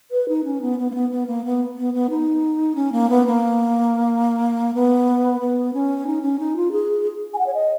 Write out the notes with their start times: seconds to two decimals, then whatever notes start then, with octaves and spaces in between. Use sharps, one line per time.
0.11 B4
0.29 D#4
0.44 C#4
0.62 B3
0.79 B3
0.90 A#3
0.95 B3
1.11 B3
1.27 A#3
1.45 B3
1.78 B3
1.94 B3
2.10 D#4
2.75 C#4
2.92 A#3
3.10 B3
3.26 A#3
4.74 B3
5.41 B3
5.74 C#4
6.07 D#4
6.22 C#4
6.40 D#4
6.56 F4
6.72 G#4
7.34 G#5
7.39 F#5
7.47 C#5
7.54 D#5